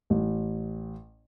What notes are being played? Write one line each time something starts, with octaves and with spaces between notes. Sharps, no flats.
A1